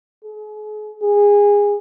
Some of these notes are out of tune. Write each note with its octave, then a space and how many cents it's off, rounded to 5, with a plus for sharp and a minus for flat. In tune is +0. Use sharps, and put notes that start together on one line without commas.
G#4 +40
G#4 -20